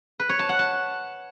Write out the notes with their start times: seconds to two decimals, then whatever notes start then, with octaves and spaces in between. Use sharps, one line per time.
0.19 B4
0.29 C#5
0.39 A5
0.49 F#5
0.59 A5